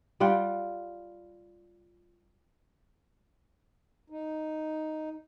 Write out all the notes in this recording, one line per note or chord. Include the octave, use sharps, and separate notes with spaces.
G3 F4 F#5 G5
D#4